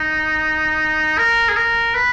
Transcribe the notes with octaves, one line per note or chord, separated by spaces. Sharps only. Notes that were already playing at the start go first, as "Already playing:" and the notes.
Already playing: D#4
A#4
G#4
A#4
B4